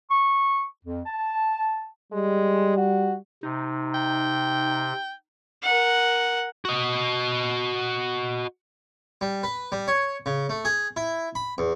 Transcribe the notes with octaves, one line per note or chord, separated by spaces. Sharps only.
C#6
F2
A5
G3 G#3
F#4
C3 D#4
G5
A#4 F#5
F#4 D#5
G3
B4
G3
C#5
C#3
A3
G#4
E4
B5
E2